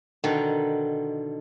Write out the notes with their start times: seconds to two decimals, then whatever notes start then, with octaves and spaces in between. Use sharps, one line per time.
0.24 B2 D3 D#3